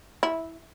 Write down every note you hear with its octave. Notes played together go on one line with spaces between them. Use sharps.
E4